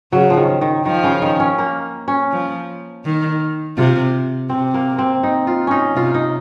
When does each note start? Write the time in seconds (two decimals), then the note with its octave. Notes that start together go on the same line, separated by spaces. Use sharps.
0.12 C#3 F#3
0.30 F3
0.37 D#3
0.61 D#3
0.86 D#3 F3
1.04 C#3
1.22 D#3
1.40 C#4
1.58 A#3
2.08 C#4
2.31 F3
3.05 D#3
3.77 C3 F4
4.49 C3 C4
4.74 A#3
4.98 C4
5.23 D#4
5.47 F4
5.67 C#4 D#4
5.95 C3 F4
6.14 D#4